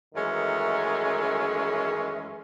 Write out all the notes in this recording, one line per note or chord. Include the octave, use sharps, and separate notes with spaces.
F#2 D#3 E3 G#3 A3 C#4